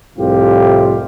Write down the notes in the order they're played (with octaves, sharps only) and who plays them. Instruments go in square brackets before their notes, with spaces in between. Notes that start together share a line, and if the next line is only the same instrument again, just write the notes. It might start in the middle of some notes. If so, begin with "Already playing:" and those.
[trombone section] C2 F2 A2 C3 F4 G4